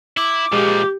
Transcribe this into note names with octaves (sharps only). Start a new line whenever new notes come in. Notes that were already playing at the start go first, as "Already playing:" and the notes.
E4 D6
A#2 F3 G#3 G4